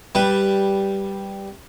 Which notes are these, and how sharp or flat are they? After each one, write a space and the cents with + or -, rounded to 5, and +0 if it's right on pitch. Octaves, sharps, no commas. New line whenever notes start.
G3 +0 B4 +0